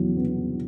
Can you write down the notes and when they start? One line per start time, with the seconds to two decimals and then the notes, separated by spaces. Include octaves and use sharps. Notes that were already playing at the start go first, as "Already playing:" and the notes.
Already playing: E2 F#3
0.16 B3